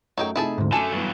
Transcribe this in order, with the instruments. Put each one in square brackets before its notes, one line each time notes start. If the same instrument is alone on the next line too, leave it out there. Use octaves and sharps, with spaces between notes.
[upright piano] F#2 A3 [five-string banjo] F#3 D#4 G5
[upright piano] C3 A3 D#4 [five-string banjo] E4 G#4 A5
[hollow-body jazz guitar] D2 G#2
[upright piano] F#2 [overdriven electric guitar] D3 A3 [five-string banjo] A4 [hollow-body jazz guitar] G#5
[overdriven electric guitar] G2 F#3 [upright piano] E3 B3